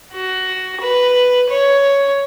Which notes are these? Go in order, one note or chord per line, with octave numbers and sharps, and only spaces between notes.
F#4
B4
C#5